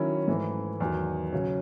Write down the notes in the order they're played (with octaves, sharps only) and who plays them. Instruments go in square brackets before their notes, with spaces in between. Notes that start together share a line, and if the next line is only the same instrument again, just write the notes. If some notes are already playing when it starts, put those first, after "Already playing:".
Already playing: [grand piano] D#3 F#3 C#4 E4
G#2 E3 A3 E4
E2 D#3 F#3
C#3 F#3 C#4